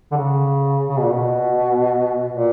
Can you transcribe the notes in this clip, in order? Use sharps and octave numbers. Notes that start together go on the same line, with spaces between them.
D3
C#3
C#3
B2
A#2
B2
A#2